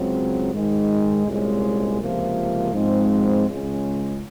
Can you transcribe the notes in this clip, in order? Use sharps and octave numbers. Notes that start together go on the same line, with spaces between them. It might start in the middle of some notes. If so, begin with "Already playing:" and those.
Already playing: C#2 C#3 F#3 C4
G#2 D#3 G#3
C2 A#2 G#3 C#4
C#2 C3 F3 A#3
G#2 F3 G#3 C4
C#2 C#3 G#3 C#4